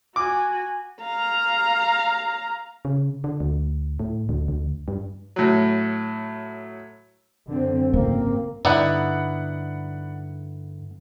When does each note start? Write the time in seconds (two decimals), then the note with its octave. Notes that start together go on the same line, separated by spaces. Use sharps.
0.16 F#4 G#5 D6
1.03 F5 A#5
2.85 C#3
3.24 D3
3.40 D2
3.99 A2
4.29 D2
4.48 D2
4.88 G2
5.36 A2 F#3
7.49 F#2 D3 C4
7.93 G#1 C#3 A#3 C4
8.65 G2 D3 B3 D#4 E4 D5 F#5 B5